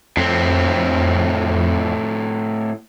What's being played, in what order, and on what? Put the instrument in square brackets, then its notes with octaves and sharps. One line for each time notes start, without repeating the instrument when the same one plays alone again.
[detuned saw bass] F2 [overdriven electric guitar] A2 C4